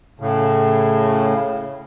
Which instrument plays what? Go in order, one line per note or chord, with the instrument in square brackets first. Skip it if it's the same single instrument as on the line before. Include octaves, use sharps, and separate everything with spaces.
[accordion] A2 C#3